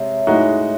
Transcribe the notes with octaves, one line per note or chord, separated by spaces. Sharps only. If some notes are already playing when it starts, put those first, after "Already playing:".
Already playing: C3 G#3 C#5 E5
A2 G#3 D#4 F#4